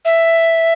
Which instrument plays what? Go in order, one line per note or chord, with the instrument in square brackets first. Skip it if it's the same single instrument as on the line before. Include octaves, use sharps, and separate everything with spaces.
[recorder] E5